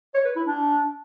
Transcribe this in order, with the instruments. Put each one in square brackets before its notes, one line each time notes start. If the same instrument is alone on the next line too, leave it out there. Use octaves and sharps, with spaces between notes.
[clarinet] C#5
B4
E4
D4